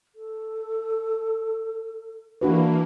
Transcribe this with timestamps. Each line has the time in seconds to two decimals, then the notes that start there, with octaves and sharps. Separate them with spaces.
0.15 A4
2.41 E3 A#3 D4 F#4 B4